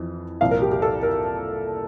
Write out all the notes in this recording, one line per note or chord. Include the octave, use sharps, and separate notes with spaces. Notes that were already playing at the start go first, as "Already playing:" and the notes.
Already playing: F2 E3
C2 A#2 F3 F5
A#4
G4
G4
A4
A#4